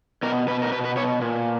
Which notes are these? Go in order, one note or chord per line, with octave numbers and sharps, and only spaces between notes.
B2 A#4
B2 B4
A#4
B2 B4
B4
B2 C#5
A#2